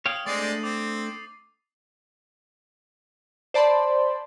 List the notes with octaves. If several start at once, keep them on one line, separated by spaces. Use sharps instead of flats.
C#5 F5 G5 D#6
G#3 A3 C4 D4 D5 A6 C7 D#7
C4 D6
C5 D5 A5 B5 C6